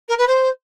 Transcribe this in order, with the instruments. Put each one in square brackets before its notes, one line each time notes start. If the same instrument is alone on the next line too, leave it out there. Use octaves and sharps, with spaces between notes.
[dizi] A#4
B4
C5